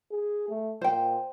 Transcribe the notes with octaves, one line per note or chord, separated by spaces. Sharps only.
G#4
A3
A#2 C5 G5